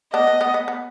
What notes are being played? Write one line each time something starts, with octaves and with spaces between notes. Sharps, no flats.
B3 D4 D#5
B3
B3
B3
B3